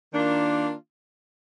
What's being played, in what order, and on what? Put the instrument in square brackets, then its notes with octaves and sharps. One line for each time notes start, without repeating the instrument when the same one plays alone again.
[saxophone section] D#3 A#3 D4 F4